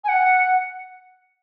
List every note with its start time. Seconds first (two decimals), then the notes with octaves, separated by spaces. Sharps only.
0.04 G#5
0.08 F#5